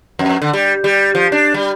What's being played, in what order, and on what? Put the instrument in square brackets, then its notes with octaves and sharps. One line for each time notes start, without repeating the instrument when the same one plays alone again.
[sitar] F2
D3
G3
G3
F3
D4
G3